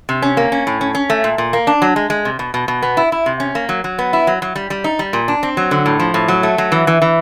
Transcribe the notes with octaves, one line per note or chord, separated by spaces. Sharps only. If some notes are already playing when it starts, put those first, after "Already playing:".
C3
C#4
A#3
C#4
A2
C#4
C#4
A3
A#2
A#2
A#3
D4
F#3
G#3
G#3
C3
B2
B2
B2
B3
E4
E4
C3
C#4
A#3
F#3
F#3
B3
E4
F#3
F#3
G3
G3
D#4
G3
A#2
D4
C4
F#3
D3
A2
F3
A2
F#3
A3
F#3
E3
E3
E3